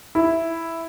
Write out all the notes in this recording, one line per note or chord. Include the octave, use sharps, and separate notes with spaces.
E4